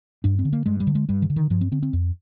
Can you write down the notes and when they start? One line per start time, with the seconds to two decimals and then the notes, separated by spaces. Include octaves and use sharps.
0.24 G2 D4
0.39 C4
0.45 D3
0.53 A#3
0.66 G2 G#3
0.80 G3
0.87 D3
0.95 G#3
1.09 G2 G3
1.22 D#3
1.30 D3
1.36 D#3
1.50 G2 F3
1.61 C4
1.72 D3 C4
1.83 C4
1.93 F2